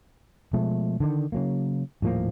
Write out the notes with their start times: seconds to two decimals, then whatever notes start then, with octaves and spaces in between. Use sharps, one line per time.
0.53 B2 F3 G#3 A3
1.00 D3 D#3
1.32 C#3 F#3 A#3
2.02 D#1 A2 F3 A#3